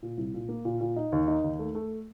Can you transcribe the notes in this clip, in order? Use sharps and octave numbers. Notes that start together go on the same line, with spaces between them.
A#2
C2
A#2
A#3
A#2
A#2
D#4
D#2
D#4
D#2
A3
A3